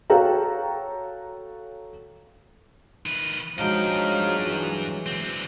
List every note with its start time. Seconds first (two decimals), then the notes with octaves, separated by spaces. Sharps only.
0.10 F#4 A4 C#5 F5 G5 A#5
3.06 D#3 B4
3.58 G2 F3 F#3 G#3 D#4 F5 G5
4.45 E3
5.06 D3 C4